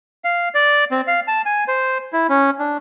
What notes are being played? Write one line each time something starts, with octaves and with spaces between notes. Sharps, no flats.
F5
D5
C4
F5
A5
G#5
C5
E4
C#4
D4